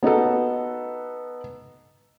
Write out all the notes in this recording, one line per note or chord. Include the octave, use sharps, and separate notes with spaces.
B3 D#4 F#4 A4